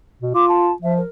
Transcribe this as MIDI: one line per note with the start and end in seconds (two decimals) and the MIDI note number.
0.22 0.34 47
0.34 0.72 65
0.34 0.47 86
0.48 0.72 81
0.82 1.01 53
0.82 0.93 76
0.97 1.09 70